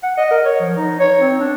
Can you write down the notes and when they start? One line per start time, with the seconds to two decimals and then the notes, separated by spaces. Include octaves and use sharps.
0.03 F#5
0.17 D#5
0.31 A#4
0.45 C#5
0.60 F3
0.77 D#4
0.99 C#5
1.21 C4
1.40 D4